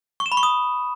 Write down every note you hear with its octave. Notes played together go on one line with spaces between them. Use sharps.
C#6
E7
B5
C#6
D#6